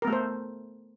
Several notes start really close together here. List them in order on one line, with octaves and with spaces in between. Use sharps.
A#4 B3 A3 A4 C5